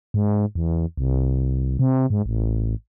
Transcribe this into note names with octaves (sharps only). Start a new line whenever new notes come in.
G#2
E2
C2
C3
G#2
A1